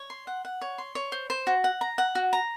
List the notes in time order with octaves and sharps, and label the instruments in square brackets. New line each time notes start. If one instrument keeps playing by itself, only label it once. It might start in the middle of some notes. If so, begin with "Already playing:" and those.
Already playing: [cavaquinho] C#5
C6
F#5
F#5
C#5
C6
C#5
C5
C5
F#4
F#5
A#5
F#5
F#4
A#5